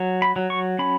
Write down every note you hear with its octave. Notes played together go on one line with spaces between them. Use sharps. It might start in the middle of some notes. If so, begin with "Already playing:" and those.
Already playing: F#3
B5
F#3
C#6
C#4 B5